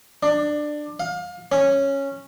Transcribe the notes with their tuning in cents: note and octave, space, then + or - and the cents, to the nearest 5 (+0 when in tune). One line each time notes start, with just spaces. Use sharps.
D4 +15
F5 +30
C#4 -10